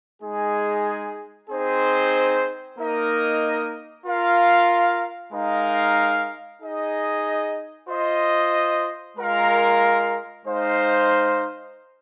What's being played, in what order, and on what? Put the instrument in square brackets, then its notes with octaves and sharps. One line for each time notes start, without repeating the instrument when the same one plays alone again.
[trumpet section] G#3 D#4 G#4
C4 D#4 G#4 C5
A#3 D#4 A#4 D#5
F4 A#4 F5
G#3 D#4 A#4 F5
D#4 G#4 D#5
F4 C5 D#5
G#3 F4 A#4 F5
G#3 D#4 C5 F5